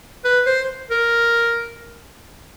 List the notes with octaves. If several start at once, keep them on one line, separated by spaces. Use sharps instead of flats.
B4
C5
A#4